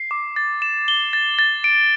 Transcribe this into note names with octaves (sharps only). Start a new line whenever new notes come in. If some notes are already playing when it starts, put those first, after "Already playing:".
Already playing: C7
D6
A6
E7
G7
A6
A6
D7